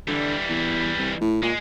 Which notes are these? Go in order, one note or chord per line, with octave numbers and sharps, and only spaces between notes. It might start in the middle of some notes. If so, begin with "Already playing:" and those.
D3 E3 G3
E2
C2
A2
A#2 G#3